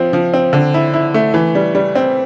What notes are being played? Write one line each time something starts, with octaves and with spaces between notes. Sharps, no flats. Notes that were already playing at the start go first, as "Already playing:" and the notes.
Already playing: F3 C4
F3
C4
D3
E4
E4
A3
E3
G3
G3
C4